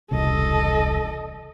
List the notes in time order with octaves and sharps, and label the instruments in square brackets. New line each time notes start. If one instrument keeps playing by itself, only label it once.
[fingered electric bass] E1 C2 C#3 [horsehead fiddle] A4 D#5